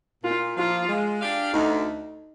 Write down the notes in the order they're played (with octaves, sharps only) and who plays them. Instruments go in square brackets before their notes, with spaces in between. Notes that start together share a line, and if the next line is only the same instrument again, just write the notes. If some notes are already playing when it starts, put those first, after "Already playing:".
[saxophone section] A#2 [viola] F4
[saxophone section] F3 A#3 [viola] F4
[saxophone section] G#3
D4 G4 D5 F5
[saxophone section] D2 [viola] D#4